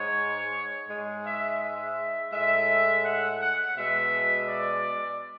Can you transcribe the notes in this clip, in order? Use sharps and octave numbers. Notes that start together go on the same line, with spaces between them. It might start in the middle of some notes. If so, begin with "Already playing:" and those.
Already playing: G#2 G#3 C#5
G#2 G#3
E5
E5
A2 G#3 E5
F#5
F#5
B2 G#3 E5
D5